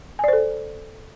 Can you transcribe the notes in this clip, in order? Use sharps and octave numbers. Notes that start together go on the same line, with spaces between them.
A4 C5 D5 G#5